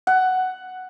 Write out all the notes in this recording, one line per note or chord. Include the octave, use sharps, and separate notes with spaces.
F#5